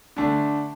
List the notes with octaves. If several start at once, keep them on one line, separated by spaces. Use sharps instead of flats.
D3 A3 D4